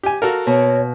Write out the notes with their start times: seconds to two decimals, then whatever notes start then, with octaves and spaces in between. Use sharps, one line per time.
0.03 G4 G#5
0.22 F#4 A4 A#4 F5
0.47 B2 C#5